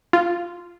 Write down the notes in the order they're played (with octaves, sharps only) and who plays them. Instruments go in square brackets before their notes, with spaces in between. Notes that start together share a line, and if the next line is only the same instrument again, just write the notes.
[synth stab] F4